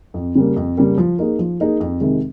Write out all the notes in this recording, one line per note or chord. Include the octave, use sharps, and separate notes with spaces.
F2
C#3 G3 A#3
F2
C#3 G3 A#3
F3
A#3 D#4 G#4
F3
A#3 D#4 G#4
F2
C3 D#3 G#3